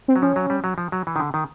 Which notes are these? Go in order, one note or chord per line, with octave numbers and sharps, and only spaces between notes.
C4
F#3
F3 C#4
F#3
G3
F#3
F3
F#3
E3
D#3
D3
D#3